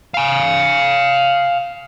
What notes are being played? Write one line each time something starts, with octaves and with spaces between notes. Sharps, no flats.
F5 G#5